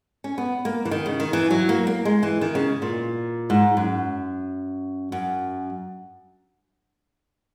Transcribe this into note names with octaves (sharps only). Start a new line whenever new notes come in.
C#4
B3
A#3
E3
D#3
C#3
D#3
E3
F#3
A#3
A#3
G#3
E3
D#3
C#3
A#2
G#2
F#2
F#2